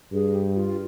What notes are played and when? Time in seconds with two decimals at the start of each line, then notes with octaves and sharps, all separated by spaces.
0.12 G2 G#4
0.35 G4
0.57 F4